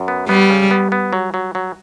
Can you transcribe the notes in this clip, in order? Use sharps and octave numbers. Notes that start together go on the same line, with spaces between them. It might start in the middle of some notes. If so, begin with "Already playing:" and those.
Already playing: F#2
B3
G3 B3
C#3
B3
B3
F#3
F#3
F#3